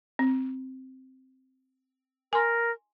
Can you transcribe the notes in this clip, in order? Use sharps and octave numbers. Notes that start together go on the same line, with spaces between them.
C4
A#4 G#5 C6